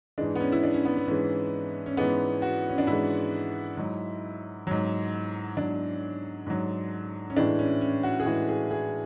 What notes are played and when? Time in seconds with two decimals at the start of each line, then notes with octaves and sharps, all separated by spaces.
0.18 G#2 E3 G#3 D4
0.35 B3
0.40 C#4
0.52 E4
0.63 D4
0.74 C#4
0.85 B3
0.97 B3
1.07 G#2 E3 G#3 C#4
1.86 C#4
1.97 G#2 E3 G#3 B3
2.42 F#4
2.70 C#4
2.78 D4
2.87 G#2 E3 G#3 E4
3.77 G#2 F#3
4.67 G#2 F#3
5.56 G#2 F#3 D4
6.47 G#2 F#3
7.30 C#4
7.36 A2 E3 G#3 D4
7.59 C#4
7.81 C#4
8.03 F#4
8.20 G#4
8.26 A2 E3 G#3 F#4
8.49 G#4
8.71 G#4